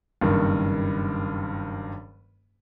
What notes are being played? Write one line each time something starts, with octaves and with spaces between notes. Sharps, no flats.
F#1 G2 D#3